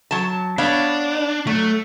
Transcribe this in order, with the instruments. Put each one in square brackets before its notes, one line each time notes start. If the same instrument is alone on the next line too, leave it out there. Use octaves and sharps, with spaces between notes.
[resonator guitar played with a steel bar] F#3 A5
[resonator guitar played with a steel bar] B3 C#5 F5 [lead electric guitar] D4
[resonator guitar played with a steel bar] F#3 [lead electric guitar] A3